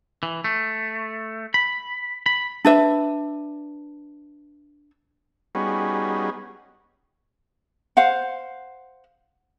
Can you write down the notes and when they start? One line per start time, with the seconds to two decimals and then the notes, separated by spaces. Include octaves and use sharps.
0.23 E3
0.44 A3
1.54 B5
2.26 B5
2.65 D4 B4 E5
5.55 G3 B3 C#4 D#4 F#4 G#4
7.97 C5 F5 F#5